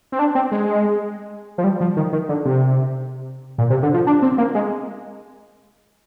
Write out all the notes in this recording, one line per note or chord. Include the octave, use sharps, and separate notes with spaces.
C4
D4
C4
G#3
F3
G3
F3
D#3
D#3
D3
C3
A#2
C3
D3
F3
D4
C4
A#3
G#3